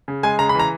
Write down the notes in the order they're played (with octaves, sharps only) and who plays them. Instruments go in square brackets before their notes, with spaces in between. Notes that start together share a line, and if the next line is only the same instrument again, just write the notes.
[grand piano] C#3
G#3 G#5
C#3 A#5
B5
E3 A#5